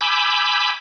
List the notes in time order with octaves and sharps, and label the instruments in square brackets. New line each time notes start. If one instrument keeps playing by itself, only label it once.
[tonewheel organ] G#5 B5 D6 E6 G6